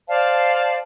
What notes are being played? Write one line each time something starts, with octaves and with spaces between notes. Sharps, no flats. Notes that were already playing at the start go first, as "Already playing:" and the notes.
C5 D5 F5 A5